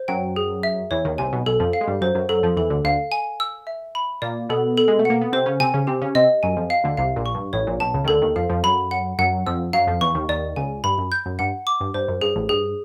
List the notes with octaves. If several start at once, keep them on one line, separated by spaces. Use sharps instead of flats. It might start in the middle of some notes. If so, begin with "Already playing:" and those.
Already playing: C5
F#2 F#3 G5
G#4
E5
E2 E3 C#5
D#2 D#3
C2 C3 G#5
B1 B2
B1 B2 A4
F2 F3
F5
G#3
G2 G3
F#2 F#3 C5
F#2 F#3
F#2 F#3 A4
F2 F3
E2 E3 A4
D2 D3
D2 D3 F5
G#5
E6
E5
B5
A#2 A#3 D5
B2 B3 A4
A4
G#3
A3
A#3 F#5
B3
C3 C4 C5
C#3 C#4
C3 C4 G#5
C#3 C#4
C3 C4 G4
C#3 C#4
C3 C4 D#5
F#2 F#3 G#5
F2 F3
F5
D2 D3
C2 C3 F5
A#1 A#2
C#6
G2
A1 A2 C#5
A#1 A#2
B1 B2 A5
C#2 C#3
D#3
D2 D3 A4
D#2 D#3
F2 F3 F5
F2 F3
F#2 F#3 B5
F#5
F#2 F#3 F#5
F2 F3 E6
F#2 F#3 F5
F2 F3
E2 E3 C#6
D#2 D#3
D#2 D#3 D5
C#2 C#3 G#5
G2 B5
F#2
G6
F#2
G2 F#5
D6
G2
G2 C5
F#2
G2 G#4
A1 A2
G2 G#4